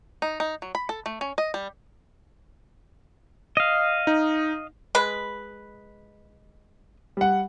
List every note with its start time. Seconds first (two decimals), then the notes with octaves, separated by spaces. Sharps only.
0.22 D#4
0.40 D#4
0.62 F#3
0.75 B5
0.89 A4
1.06 A3
1.21 C#4
1.38 D#5
1.54 G3
3.57 D#5 F5
4.07 D#4
4.95 G#3 B4
7.17 G3 F#5